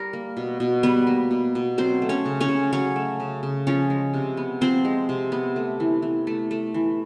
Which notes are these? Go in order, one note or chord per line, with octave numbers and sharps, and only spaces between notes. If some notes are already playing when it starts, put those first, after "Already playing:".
Already playing: G3 A#4
A#3
B2
B2
G3 B3 B4
A#3
B2
B2
F#3 C4 C5
A3
C#4 C#5
C#3
C#4 C#5
C#3
F#3 C#4 C#5
A3
C#3
C#3
F3 C#4 C#5
G#3
C3
B3
F3 C4 C5
G#3
C3
B3
A3
E3
E3
A3
A3
E3